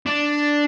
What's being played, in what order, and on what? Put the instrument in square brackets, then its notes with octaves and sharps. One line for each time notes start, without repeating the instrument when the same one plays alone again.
[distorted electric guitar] D4